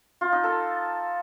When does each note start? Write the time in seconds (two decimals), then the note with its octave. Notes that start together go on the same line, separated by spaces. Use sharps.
0.21 F4
0.32 D#4
0.44 A4